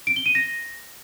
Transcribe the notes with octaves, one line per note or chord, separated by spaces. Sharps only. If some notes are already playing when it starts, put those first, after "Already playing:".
D7
G7
D#7
A#6